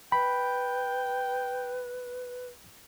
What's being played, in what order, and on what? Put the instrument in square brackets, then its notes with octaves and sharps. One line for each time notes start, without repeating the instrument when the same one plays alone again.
[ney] B4 [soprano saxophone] G5 [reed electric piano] B5